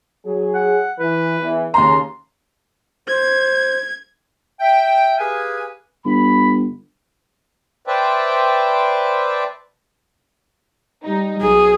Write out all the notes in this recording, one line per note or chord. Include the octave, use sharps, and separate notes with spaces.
F#3 G#4
F#5
E3 B4
E2 E3
D#2 C#3 A#5 C6
C5 G#6
E5 G5
G4 G#4 B4 F5 G#5
G1 B5
B4 C5 D5 E5 G5 A5
G3 D#4
B1 G#4